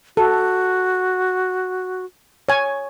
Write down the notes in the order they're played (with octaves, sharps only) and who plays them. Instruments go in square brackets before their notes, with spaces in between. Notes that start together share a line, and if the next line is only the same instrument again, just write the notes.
[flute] F#4 [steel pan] A4
[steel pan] C#5 G#5